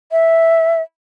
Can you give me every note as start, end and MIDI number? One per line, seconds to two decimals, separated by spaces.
0.12 0.82 76